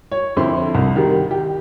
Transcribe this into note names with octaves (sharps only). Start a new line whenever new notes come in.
C#5
F2 D3 E4 C5 C6
C2
D#3 G3
G4